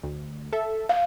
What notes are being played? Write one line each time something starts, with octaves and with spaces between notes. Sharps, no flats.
D2
A4 E5
F5